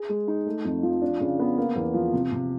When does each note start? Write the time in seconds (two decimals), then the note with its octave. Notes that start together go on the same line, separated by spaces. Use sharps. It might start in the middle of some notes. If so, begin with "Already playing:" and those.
Already playing: G#4
0.09 G#3
0.28 D#4
0.46 A3
0.65 F2
0.83 F3
1.02 D4
1.21 C#3
1.39 B3
1.57 A#3
1.76 E2
1.94 F3
2.13 C3
2.32 C3